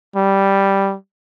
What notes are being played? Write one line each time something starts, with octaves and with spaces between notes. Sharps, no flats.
G3